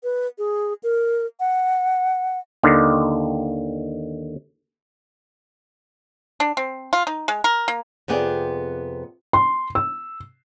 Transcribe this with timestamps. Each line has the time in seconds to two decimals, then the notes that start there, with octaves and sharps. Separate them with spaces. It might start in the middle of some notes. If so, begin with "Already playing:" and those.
0.03 B4
0.38 G#4
0.83 A#4
1.40 F#5
2.63 D#2 D3 D#3
6.40 D4
6.57 C4
6.93 F4
7.07 D#4
7.28 G#3
7.44 A#4
7.68 A#3
8.08 F2 C3 B3 G#4 D5
9.33 C6
9.75 E6